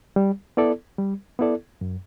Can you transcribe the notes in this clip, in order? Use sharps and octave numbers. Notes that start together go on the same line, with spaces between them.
G3
B3 E4 A4 D5
G3
B3 E4 A4 D5
F#2